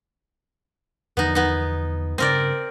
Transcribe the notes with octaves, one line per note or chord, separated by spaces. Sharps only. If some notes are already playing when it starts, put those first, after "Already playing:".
E2 D3 F3 B3 D#4
B3 D#4
G2 C#3 C4 A#4 D5